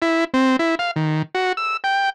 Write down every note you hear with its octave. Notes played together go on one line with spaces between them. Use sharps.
E4
C4
E4
F5
D#3
F#4
E6
G5